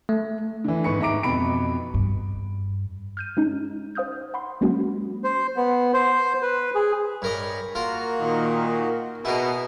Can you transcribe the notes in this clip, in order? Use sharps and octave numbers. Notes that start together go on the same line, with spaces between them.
A3
D3 E3
G#1 G#2 B4 C#6 C#7
G#2 E5 A#5 D6 D7
F2 B2 B5 D7
G2
F6 G6 D#7
G#3 C#4 D#4
C5 F5 D#6 F6 G6
F#5 B5 C6
F#3 G#3 A#3 C#4 F#4
C5
B3
C5
B4
G#4
G2 A#4 C#5 D#5 B5
A#3 F4 F#4 A#4
A#2 D#3
B2 E4 G#4 A#4 D#6